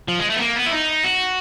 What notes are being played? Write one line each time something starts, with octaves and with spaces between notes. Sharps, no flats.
F3
G#3
A3
B3
A#3
B3
E4
D#4
F#4